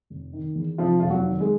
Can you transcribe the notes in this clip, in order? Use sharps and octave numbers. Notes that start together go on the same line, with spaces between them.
F1
D#3
E2
C3 F3 F4
F1 F4
F#3 F#4
D#3
G#3 G#4